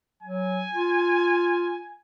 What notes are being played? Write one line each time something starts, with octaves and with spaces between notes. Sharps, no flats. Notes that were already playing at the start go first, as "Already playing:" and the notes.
F#3 G#5
F4